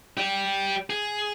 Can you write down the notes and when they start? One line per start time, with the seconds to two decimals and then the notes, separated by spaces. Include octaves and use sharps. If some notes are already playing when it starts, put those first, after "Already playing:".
0.18 G4 D5
0.90 G#4